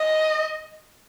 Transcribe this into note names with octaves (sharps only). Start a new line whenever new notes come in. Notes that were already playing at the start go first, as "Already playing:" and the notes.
Already playing: D#5